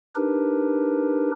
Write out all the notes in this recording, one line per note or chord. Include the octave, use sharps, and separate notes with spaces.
D4 D#4 G4 A#4 B4